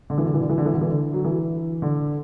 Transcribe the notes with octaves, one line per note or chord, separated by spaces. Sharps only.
D3
E3
D3
E3
D3
E3
D3
E3
D3
E3
D3
F#3
E3
D3